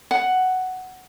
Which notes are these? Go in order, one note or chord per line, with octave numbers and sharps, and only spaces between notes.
F#5